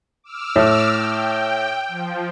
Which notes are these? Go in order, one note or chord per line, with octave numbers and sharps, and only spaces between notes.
D6 E6 F6
A2
G5
F3